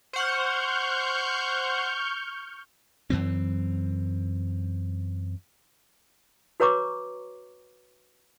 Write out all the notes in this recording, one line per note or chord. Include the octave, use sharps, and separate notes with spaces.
C5 F#5 C#6 F6 G6
F#2 E3 C4
F#4 B4 C#5 A#5 C#6 D6